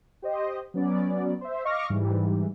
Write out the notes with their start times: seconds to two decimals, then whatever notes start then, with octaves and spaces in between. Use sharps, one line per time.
0.22 G4 C5 D#5
0.74 F#3 B3 C#4 D5
1.41 C5 E5
1.64 D#5 F5 C#6 D6 F6 A#6
1.90 G#2 E3 G3